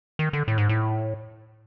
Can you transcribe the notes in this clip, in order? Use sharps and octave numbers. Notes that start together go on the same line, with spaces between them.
D#3
D3
A2
G#2
A2